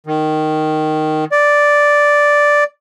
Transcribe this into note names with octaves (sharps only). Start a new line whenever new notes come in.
D#3
D5